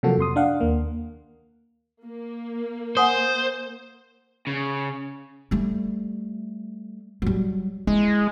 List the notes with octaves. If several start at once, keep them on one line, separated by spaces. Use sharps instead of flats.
C3 F3 F#3 A#3 F#4 A4
F2 C3 C6 D#6
D4 F5 F#5
D#2 A#3
A#3
C5 F#5 G#5 D#6
C#3
G3 A3
F#3 G3
G#3 E4